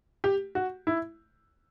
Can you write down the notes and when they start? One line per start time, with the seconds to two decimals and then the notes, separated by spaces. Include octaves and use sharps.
0.24 G4
0.55 F#4
0.87 E4